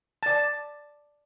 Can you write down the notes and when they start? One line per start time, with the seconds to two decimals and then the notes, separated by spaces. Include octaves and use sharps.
0.23 D5 A5